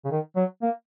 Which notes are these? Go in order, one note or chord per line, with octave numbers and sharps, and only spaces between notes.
C#3
D#3
F#3
A#3